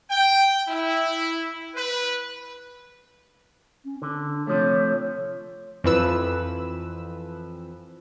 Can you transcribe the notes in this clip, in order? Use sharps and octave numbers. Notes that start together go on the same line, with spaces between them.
G5
E4
B4
C#4
D3 D4
C3 F3 A3 C#5
F2 E3 F3 B4 E6